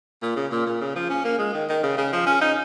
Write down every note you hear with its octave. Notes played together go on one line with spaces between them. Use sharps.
A#2
C#3
A#2
A#2
C#3
F3
C#4
A#3
G#3
D#3
D#3
C#3
C#3
F3
C#4
D#4